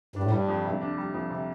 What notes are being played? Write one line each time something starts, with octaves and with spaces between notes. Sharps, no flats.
G2 D4
A2
G2 G3
F2
C3
D4
G3
F2
C3